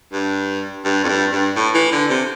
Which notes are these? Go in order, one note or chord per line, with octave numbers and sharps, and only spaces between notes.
G2
G2
F2
G2
G2
A2
E3
D3
C3